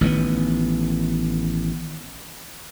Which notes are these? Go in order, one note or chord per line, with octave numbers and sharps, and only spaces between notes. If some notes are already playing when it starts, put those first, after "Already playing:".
A1 D#3 A#3 B3